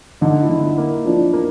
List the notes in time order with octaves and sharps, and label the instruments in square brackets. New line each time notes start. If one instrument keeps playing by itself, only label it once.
[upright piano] D3 [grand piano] D#4
[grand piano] E4
[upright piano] D3
[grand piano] E4
[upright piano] A#3
[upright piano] F3 [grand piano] D4
[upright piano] A#3